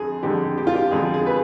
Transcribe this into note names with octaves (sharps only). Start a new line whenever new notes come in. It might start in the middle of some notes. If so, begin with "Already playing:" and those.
Already playing: F2 D3 G#4
F2 D3 G#3 G4
G4
F4
G4
F2 D3 G#3 G#4
G#4
B4